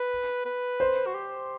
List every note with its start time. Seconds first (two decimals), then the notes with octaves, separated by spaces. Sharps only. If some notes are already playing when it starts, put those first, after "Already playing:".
Already playing: B4
0.45 B4
0.80 C5
1.06 F#4
1.15 G4